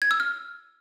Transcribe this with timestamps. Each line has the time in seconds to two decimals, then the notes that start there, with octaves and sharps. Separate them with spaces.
0.02 G#6
0.11 E6
0.20 F6